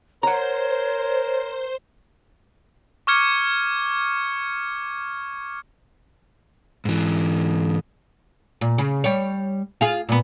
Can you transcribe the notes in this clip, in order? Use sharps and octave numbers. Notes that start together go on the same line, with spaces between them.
A#4 C5 C#5 F#5 A#5
C#6 D6 F6 G#6 C#7
G#2 E3
A#2
C#3
G3 C#5
F4 G#4 F5
A#2 B3